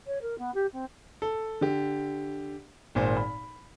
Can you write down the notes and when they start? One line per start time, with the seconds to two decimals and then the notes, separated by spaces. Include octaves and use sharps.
0.06 C#5
0.21 A#4
0.38 B3
0.54 G4
0.72 C4
1.22 A4
1.61 D3 G4
2.95 G#1 A#2 C5
3.17 B5